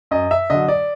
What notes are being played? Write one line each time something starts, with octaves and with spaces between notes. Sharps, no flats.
F#2 D#5
E5
D3 F#3 D#5
D5